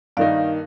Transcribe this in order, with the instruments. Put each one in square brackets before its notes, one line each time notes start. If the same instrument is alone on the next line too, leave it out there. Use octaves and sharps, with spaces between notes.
[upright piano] G2 D#3 A#3 D#4 [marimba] D5 F5